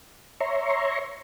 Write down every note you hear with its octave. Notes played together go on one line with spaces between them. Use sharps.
C#5 E5 A#5 C6 C#6